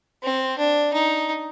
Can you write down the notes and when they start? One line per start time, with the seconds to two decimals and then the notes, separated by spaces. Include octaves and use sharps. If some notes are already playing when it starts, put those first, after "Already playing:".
0.24 C4
0.59 D4
0.94 D#4